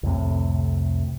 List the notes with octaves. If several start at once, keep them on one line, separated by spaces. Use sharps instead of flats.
C2 F2 A2 C3